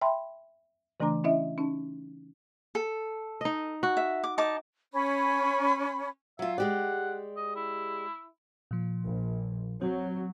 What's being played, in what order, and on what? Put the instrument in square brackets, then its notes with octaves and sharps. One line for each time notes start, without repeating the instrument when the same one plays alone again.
[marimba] E5 G5 A5 B5 C6
C#3 E3 A3 D4 A#5 D6
C#4 E4 D#5 E5
C#4 D#4 A5
[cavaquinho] A4
[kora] D#4 D#5
F#4
[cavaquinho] E5
D6
D#4 A5 D6
[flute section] C#4 B5
[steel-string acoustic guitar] F#3 F4 [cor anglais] E5
[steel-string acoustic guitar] G#3 G4 D5 [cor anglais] F#5
[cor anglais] D#5
E4
[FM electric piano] A#2 F3
[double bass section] A#1
[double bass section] F#3 [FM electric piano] C4